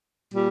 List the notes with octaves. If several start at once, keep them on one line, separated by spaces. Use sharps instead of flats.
A#2 G3